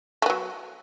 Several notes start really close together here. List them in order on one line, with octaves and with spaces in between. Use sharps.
A3 B3 F#3